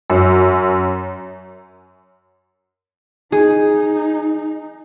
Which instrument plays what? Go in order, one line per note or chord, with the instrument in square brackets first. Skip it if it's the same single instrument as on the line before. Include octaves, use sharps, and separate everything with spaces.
[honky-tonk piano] F#2
[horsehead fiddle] D#4 [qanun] G#4